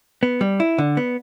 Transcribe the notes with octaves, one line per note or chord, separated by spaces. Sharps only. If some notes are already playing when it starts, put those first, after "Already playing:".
B3
G3
E4
D3
B3